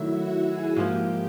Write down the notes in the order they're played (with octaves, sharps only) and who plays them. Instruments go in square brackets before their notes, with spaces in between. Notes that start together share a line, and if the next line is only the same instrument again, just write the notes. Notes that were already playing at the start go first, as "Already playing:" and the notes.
Already playing: [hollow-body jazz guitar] D#3 F#3 A3 [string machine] E4 E5
[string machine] F#4 F#5
G#4 G#5
[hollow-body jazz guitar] G#2 F3 A#3 [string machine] G4 G5